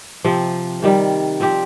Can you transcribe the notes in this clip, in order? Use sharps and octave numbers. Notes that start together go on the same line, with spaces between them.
C3 F3 C4
C3 D#3 G3
F3 C4 G4